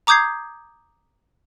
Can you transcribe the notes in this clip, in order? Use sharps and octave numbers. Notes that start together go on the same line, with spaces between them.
A#5 D6 D#6 G6 G#6 C7